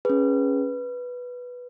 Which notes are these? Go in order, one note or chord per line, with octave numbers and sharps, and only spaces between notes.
C#4 G#4 B4